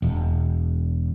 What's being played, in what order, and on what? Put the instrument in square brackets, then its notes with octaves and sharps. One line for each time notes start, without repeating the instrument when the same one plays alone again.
[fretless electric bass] E1